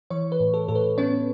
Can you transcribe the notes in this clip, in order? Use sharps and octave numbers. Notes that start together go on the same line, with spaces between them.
E3 C#5 C#6
B4
A2
A4
A2 A4
B4
B3 C#4 C#5